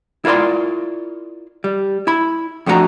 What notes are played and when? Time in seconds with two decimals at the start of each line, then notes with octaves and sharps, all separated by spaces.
0.25 E4 F4 A#4 D5 C6
1.64 G3
2.07 E4 B5
2.66 F2 A3 D4 F4 F#4 A#5